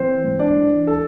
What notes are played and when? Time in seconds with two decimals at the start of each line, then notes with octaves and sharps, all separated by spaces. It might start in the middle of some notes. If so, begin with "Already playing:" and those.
Already playing: E3 C4 C5
0.24 G#2
0.39 D4 D5
0.55 E3
0.87 A4